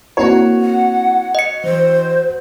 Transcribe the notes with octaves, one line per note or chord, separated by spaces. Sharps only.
A#3 C4 E4 F#4 C#5
F#5
D#5 C#7
E3 C5